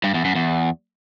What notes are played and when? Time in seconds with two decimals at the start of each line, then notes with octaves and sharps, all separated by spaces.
0.04 G2
0.14 E2
0.25 F#2
0.35 E2